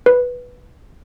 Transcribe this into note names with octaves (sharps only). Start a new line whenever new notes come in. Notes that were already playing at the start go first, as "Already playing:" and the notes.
B4